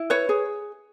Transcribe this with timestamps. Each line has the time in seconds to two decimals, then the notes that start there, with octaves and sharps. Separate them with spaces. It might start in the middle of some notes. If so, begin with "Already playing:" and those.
Already playing: E4
0.10 B4 C#5
0.29 G#4